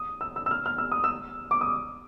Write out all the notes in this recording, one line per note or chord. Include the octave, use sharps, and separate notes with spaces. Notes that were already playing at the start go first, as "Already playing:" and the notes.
Already playing: D#6
E6
E6
E6
F6
F6
E6
D#6
E6
D6
D#6